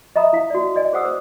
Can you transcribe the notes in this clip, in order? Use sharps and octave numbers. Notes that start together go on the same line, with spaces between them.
D#5 E5 A#5 B5 D#6
E4 F5
F#4 D5
D5 D#5 G#5
G#4 C5 F#5 D#6 E6
G#4 C5